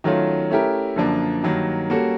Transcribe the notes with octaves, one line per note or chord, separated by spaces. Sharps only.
D#3 F#3 A3 C#4 F4
A3 C#4 E4 G4 A#4
F#2 D3 F3 A#3 D4
G2 D#3 F#3 A#3
G3 A#3 C#4 F#4 A4